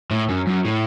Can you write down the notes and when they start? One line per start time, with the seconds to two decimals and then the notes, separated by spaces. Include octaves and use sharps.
0.11 A2
0.29 F#2
0.47 F#2
0.65 A2